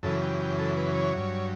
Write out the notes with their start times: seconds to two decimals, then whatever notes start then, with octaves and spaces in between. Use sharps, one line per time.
0.03 F#2 C#3 E3 A4
0.22 G4
0.40 G4
0.59 A4
0.76 B4
0.95 C#5
1.13 G2 F#3